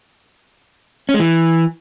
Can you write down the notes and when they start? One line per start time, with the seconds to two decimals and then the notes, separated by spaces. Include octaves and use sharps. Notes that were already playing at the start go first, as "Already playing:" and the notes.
1.09 C#4
1.14 G#3
1.20 E3